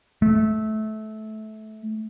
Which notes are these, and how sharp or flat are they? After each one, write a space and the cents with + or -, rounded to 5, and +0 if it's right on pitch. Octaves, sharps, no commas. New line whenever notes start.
A3 -20